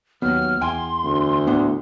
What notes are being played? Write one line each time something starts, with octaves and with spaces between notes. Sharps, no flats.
D#2 F#3 B3 F6
E2 G5 G#5 C6
D2
A2 D3 B3